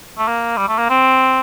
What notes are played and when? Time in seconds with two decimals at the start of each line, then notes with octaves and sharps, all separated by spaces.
0.18 A3
0.28 A#3
0.57 G3
0.68 A3
0.78 A#3
0.90 C4